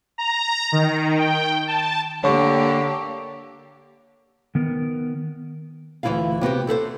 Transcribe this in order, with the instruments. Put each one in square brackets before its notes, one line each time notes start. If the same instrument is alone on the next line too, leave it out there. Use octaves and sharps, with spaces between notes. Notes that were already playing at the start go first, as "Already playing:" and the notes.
[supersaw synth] A#5
D#3
G5
A5
[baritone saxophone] D3 [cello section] A#3 G4 [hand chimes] C#5 C#6
[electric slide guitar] D#3 B3 A#4
[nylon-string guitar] D2 E3 A3 E4 F4 F5
C3 B3 F#4 G4
E4 A4 B4 C5